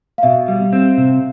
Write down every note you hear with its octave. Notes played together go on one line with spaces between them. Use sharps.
F5
B2 E5
G3
C4
C3